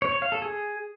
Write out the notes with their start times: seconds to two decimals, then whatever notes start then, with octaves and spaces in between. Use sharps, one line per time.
0.02 C#5
0.12 C#5
0.22 F5
0.32 A4
0.42 G#4